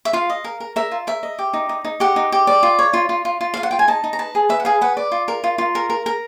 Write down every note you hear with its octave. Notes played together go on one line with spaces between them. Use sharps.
E5
F4 F5
D#5
A#4
A#4
A#4 E5
F4
A#4 E5
D#5
G4
D#4
D#4
D#4
G4 F#5
D#4
G4
D5
F4
C#5
F4
F4
F4
F4
F5
F4
F#5
F4 G5
G#5
D#4 A5
D#4
A#5
B4 A5
G#4
B4 E5
F#5
G#4 F5
B4 F#5
D5
F4
A#4
F4
F4
A#4
A#4
A#4